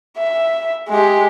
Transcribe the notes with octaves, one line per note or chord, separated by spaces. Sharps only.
E5
G#3 G4